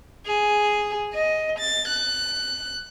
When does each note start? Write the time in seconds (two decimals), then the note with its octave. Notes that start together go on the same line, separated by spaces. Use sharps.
0.26 G#4
1.14 D#5
1.59 A6
1.88 F#6